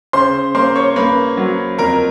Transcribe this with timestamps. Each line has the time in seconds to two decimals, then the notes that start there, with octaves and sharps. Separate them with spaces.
0.13 C#3 C5 C6
0.55 A#3 C5 C6
0.75 C#5 C#6
0.96 A#3 B4 B5
1.37 F#3
1.78 F2 A#4 A#5